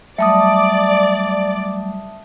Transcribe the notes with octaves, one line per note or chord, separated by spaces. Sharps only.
F#3 G3 A3 D5 E5 A5 D#6